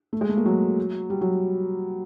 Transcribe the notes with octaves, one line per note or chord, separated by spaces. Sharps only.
A3
G#3
A3
A#3
F#3
G3
F#3